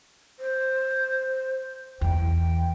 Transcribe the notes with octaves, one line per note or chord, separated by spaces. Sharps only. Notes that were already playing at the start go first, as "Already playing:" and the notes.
C5
E2 G5